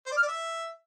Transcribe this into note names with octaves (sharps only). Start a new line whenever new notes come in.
C5
D5
F6
D5
E5